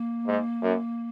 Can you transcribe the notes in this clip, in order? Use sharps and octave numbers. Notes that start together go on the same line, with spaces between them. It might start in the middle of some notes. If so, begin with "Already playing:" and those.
Already playing: A#3
G#2
F#2